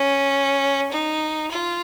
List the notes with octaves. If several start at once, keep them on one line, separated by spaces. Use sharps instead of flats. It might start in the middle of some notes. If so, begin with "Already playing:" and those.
Already playing: C#4
D#4
F4